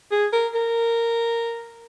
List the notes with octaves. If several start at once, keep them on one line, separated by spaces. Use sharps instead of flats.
G#4
A#4
A#4